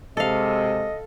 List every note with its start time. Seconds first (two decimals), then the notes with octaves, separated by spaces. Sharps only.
0.17 C3 G#3 A4 D#5 F5